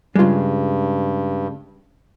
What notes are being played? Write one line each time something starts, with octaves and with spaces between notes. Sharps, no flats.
G2 C#3 G3 G#3 F4